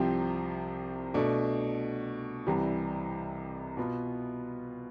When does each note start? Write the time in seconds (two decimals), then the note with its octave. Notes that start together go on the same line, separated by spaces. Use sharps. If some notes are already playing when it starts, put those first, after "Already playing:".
Already playing: C2 C3 F3 C4 G4
1.14 B2 A3 D4
2.47 C2 C3 E3 G3
3.77 B2 B3 F4